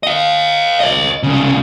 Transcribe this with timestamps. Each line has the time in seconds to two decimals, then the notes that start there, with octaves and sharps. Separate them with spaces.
0.03 D#5 F5
0.80 C#5 D#5
1.23 C2 C#3